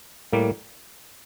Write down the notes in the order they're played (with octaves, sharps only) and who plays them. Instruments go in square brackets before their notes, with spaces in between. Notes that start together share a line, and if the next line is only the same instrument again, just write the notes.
[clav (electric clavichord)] A2 G3 A#3